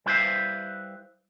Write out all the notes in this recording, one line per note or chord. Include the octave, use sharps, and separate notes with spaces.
G3 E4 B4 C5 E5 F5